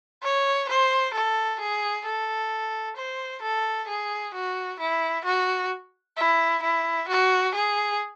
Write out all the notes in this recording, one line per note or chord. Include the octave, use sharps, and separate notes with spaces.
C#5
C5
A4
G#4
A4
C5
A4
G#4
F#4
E4
F#4
E4
E4
F#4
G#4